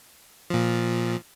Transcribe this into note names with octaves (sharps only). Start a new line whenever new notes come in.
A#2 F3